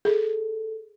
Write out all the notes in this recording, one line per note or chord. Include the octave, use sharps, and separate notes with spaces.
G#4 A4